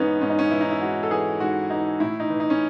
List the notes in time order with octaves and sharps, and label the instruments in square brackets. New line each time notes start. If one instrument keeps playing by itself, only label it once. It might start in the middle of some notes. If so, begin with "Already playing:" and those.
Already playing: [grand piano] G#2 E3 B3 C#4 D#4
G#2 C#4
D#4
C#4
E3 E4
D#4
E4
G#2 F#4
A4
E3 G#4
G#2 F#4
E3 D#4
A2 E4
D#4
E3
D#4
C#4